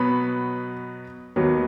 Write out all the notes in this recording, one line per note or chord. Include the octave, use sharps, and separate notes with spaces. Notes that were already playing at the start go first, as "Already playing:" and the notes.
Already playing: B2 F#3 B3 B5
D#2 D#3 F#3 B3